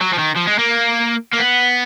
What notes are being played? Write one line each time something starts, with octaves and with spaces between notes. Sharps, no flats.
F#3
F3
D#3
F3
G#3
A#3
A#3
B3